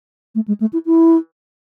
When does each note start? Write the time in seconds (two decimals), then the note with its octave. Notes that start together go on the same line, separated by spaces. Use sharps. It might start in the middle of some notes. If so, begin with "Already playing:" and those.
0.35 A3
0.48 G#3
0.60 A3
0.73 E4
0.86 E4